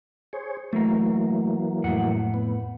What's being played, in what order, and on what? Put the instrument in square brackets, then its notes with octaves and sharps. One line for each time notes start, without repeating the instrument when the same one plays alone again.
[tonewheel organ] G#4 C5 C#5
[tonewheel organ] E3 F#3 A#3 [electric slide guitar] A3 A#5
[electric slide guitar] F2 A2 F#5
[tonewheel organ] B3